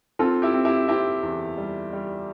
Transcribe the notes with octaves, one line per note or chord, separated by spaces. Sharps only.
C4 F4 A4
E4 G4
C4
E4 G4
C4 E4 G4
E2
G3
G3